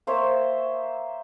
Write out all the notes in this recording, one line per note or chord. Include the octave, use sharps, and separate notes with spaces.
A#3 C5 C#5 E5